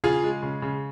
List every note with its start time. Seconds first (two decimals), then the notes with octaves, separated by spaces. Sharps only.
0.04 C#3 F4 G#4
0.23 G#3
0.43 C#3
0.62 C#3